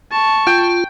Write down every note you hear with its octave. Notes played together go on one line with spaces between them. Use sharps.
A5 C#6
F4 G5